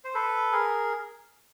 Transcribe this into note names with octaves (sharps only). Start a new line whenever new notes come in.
C5
A4 B4
G#4 A#4